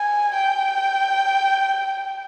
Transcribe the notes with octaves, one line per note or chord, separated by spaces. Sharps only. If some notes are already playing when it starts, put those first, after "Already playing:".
Already playing: G#5
G5